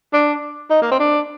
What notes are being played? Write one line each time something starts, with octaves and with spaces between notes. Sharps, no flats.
D4
D#4
A#3
C4
D4